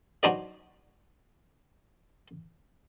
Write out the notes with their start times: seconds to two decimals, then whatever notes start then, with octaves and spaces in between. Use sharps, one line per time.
0.23 F#3 D4 D#4 F#4 C5 D5